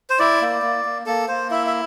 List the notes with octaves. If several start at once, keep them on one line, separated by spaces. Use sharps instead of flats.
C5
E4 D5
A#3
A#3
A#3
A#3 A4
A#3 C5
E4 E5
E5